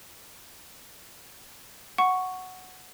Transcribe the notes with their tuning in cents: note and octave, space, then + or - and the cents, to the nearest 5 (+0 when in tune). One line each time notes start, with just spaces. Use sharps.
F#5 +0 C#6 +0